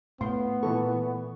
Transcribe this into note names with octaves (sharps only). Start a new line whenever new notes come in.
A2 B3 F5 C6
A#2 E3 A4 B4 C#6